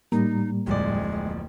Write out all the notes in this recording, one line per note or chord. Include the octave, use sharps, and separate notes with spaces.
A2 G3 A#3 D#4
D1 F2 G#3 D5